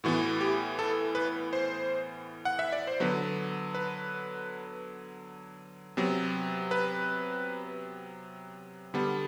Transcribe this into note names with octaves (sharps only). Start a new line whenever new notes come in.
A2 E3 B3 F#4
G4
A4
B4
C5
F#5
E5
D5
C5
D3 F#3 B3 B4
B4
C3 F#3 B3
B4
D3 G3 B3